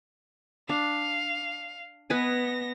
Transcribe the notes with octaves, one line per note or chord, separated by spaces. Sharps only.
D4 F5
B3 B4 D#5 G#5 A#6